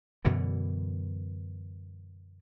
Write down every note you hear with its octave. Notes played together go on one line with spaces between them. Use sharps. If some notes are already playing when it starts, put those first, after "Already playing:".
F#2 B2 D3 E3